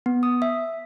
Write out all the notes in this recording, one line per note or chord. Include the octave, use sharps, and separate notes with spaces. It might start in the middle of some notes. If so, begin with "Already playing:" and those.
B3
D#6
E5